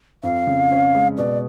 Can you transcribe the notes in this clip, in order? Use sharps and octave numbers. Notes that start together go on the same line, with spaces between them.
F2 F5
C#3
C#4
G#3
B2 D5